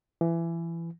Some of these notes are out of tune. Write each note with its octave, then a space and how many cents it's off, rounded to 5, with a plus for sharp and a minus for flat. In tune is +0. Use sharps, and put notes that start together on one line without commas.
E3 +20